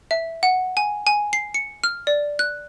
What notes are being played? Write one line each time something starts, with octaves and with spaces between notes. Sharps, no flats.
E5
F#5
G#5
G#5
C7
C#7
F6
D5
F#6